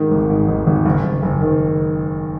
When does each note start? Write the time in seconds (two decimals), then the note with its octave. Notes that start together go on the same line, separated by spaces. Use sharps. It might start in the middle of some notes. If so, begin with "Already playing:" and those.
Already playing: G#2 D#3
0.12 G#1
0.30 G#2
0.48 G#1
0.67 G#1
0.85 F#1
1.04 F#1
1.22 F#1
1.40 D#3